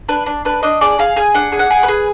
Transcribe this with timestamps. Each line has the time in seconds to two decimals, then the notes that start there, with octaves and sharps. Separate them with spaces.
0.09 D4 B4
0.26 D4
0.45 D4 B4
0.63 D4 D#5
0.81 G#4 D5
0.99 G#4 F5
1.16 G#4 G#5
1.34 D4 F#5
1.52 G#4
1.59 F#5
1.70 G#4
1.83 B4
1.88 G#4